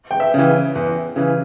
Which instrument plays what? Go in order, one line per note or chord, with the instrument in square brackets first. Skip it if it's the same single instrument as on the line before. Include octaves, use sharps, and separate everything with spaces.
[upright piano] G5
E5
[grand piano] C#3 E3
E2
C#3 E3